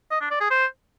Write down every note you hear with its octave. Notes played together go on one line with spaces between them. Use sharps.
D#5
D4
D5
G#4
C5